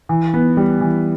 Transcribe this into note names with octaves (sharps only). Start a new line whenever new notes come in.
E3
B3
G3
E3